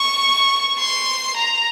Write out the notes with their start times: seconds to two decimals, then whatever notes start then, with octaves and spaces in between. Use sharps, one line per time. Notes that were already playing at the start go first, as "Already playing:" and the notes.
Already playing: C#6
0.79 C6
1.36 A#5